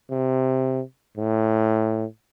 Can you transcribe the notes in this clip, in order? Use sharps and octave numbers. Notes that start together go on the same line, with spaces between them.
C3
A2